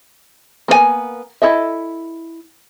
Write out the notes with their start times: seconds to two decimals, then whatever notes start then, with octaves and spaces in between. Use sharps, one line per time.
0.68 A#3 B3 B4 G#5
1.42 E4 A4 D#5 E5